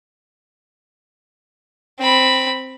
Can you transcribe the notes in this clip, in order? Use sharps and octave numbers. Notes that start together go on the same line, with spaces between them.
C4 B5